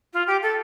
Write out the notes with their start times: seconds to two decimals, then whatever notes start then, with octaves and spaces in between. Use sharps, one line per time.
0.13 F4
0.27 G4
0.42 A4